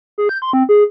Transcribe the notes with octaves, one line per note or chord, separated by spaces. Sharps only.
G#4
G6
C6
C4
G#4